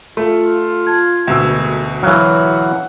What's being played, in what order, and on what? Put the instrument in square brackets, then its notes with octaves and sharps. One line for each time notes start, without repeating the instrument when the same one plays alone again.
[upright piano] A3 [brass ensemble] F4
[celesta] A5 G#6
[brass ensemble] A1 G#3 A#3 [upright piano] D2 B2 E6
[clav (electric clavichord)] E3 F#3 [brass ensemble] E4 F#4 F#5 [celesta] C#5 F5 F6